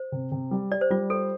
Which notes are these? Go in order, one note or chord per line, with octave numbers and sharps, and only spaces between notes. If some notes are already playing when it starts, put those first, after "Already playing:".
Already playing: C5
C3
C3
G3
G4 D5
C5
G3 F4
A4 C5